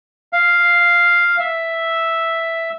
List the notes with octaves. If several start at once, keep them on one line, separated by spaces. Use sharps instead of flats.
F5
E5